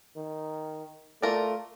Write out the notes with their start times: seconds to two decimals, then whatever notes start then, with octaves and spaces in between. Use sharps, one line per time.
0.17 D#3
1.22 A3 F4 A#4 D5